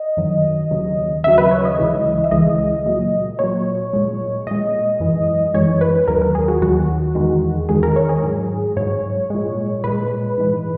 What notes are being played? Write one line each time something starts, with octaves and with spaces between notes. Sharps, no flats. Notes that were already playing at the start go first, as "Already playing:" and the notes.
Already playing: D#5
F#2 D#3 F#3
D#2 C#3 F#3
D#2 C#3 F#3 E5
B4
C#5
D#5
C#2 C#3 E3 G#3
E5
C#2 C#3 E3 G#3 D#5
A#2 F#3
A#2 F#3 C#5
A#2 G#3
A#2 G#3 D#5
F#2 E3 G#3
F#2 E3 G#3 C#5
B4
D#2 D#3 F#3 A#4
A#4
G#4
F#4
D#2 D#3 F#3 F#4
E2 D#3 G#3
E2 D#3 G#3 G#4
A#4
C#5
G#4
G#2 F#3
G#2 F#3 C#5
A#2 G#3
A#2 G#3 B4
G#2 E3 G#3